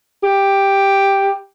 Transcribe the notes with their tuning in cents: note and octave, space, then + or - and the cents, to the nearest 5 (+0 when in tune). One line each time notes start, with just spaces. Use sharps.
G4 +5